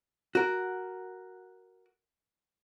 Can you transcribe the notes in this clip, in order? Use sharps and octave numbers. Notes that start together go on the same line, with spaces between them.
F#4 A#4